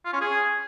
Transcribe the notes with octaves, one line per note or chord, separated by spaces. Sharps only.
F4
C#4
G#4